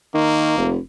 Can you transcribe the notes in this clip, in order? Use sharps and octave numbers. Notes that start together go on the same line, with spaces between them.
D#3 A#3
F1